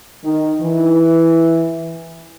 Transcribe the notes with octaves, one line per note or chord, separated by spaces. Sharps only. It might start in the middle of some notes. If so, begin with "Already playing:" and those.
D#3
E3